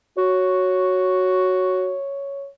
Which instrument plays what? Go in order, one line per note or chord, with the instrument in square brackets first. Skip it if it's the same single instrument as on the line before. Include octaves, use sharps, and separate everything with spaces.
[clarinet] F#4 [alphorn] C#5